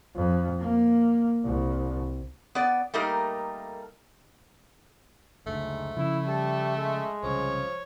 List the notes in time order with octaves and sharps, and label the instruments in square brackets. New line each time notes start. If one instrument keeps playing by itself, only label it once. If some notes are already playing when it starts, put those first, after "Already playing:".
[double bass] F2
A#3
C2
[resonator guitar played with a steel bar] B3 D5
G3 A3 A#3 D#4 A#4
[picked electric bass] F#1 D2 [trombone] G#2 [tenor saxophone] A3
[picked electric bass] C#3 F3 C#4 [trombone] E4
[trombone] G3 [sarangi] A4
[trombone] G#3
[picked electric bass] C2 C#3 [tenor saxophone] F3 [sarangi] C#5